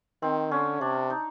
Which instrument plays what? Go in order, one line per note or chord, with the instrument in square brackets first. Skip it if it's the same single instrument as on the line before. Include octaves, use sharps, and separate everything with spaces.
[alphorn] D#3 [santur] C4
[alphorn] D3 [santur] C#4
[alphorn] C3 [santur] D4
[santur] D#4